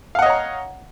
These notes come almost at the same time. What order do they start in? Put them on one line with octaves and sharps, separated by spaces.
F5 F#5 D#5 C#5 A#5